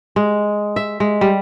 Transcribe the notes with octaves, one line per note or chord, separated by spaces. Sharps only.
G#3
E5
G#3
G3